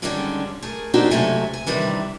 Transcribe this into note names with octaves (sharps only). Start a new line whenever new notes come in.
D3 D#3 G3 G#3 C#4 D4
A3 G#4 A#4
A#3 C4 D4 D#4 F#4 G4
G#2 C3 F#3 A3 G#5
G#5
C3 D#3 E3 G3 D4